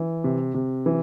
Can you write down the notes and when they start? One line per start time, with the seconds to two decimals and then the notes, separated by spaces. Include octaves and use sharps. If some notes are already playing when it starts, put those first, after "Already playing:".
Already playing: E3
0.24 C3
0.54 C3
0.86 E3